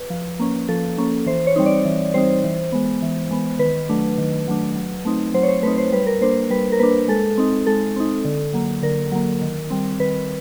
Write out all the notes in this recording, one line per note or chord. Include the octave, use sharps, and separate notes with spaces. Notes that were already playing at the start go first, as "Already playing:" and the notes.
Already playing: B4
F3
A#3 C#4
F3 A4
A#3 C#4
E3 C5
C#5
G3 C4 D#4
D5
E3
G3 C4 D#4 C5
E3
G#3 B3
E3
G#3 B3
D#3 B4
F#3 A3 D4
D#3
F#3 A3 D4
F#3
A3 C4 D#4
F#3 C5
C#5
C5
A3 C4 D#4 B4
C5
G3 B4
A#4
A#3 D4 C5
G3 B4
A#4
A#3 D4 B4
G#3 A4
C4 D#4
G#3 A4
C4 D#4
D3
F#3 A#3
D3 A#4
F#3 A#3
D#3
G3 C4
D#3 B4